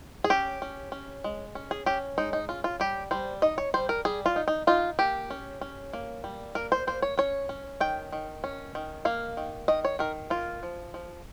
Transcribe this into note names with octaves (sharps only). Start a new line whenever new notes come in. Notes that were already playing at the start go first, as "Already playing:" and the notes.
G#4
C#4 G4
C#4
C#4
G#3
C#4
G#4
C#4 G4
G#3 D#4
D#4
C#4 F4
F4
G3 G4
G3 C5
D#4 D#5
C#5
G3 C5
A#4
G3 G#4
F4
D#4
D#4
D#4 F4
A#3 G4
C#4
C#4
A#3
G3
A#3 A#4
C5
A#3 C5
C#5
C#4 C#5
C#4
D#3 G5
D#3
C#4
D#3
A#3 F5
D#3
D#3 D#5
C#5
D#3 A#4
A#3 F4
F3
F3